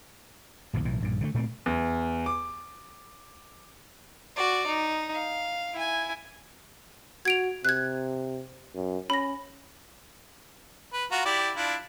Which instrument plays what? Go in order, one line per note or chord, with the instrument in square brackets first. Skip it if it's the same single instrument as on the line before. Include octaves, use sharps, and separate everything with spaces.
[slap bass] A#1 D#2 C3 F3
B1 A2 E3
A#1 G2 A#2
D3 E3 A3
A#2 A3 C4
[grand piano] E2
D6
[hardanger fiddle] F#4 D5
D#4
F5
E4 G#5
[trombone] F#4 [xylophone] G#6 D7 F7
[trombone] C3 [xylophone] F#6 G#6
[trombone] F#2
[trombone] C#4 [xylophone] B5 A#6
[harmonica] B4
F4 F#4 A#5
E4 G4 D5
D4 E4 F4